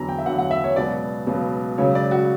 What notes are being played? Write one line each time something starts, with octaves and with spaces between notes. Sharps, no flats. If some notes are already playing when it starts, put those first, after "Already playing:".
Already playing: E2 D3 F#3 A#5
G5
E5
E2 D3 F#3 F#5
F#5
E5
C#5
C#2 B2 F#3 D5
C#2 B2 F#3
C#2 C#3 F#3 C#5
D5
F#4